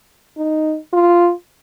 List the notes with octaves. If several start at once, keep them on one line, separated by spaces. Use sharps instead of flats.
D#4
F4